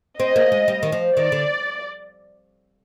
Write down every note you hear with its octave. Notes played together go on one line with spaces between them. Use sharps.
C4 D#5
A#3
G#3
G3
D#3
F3
D#3 D5
D3